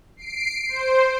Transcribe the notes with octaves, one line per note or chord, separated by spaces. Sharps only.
C7 D7
C5